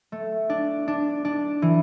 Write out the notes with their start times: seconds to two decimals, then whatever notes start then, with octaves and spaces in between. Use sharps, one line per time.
0.12 A3
0.50 D4
0.88 D4
1.25 D4
1.62 E3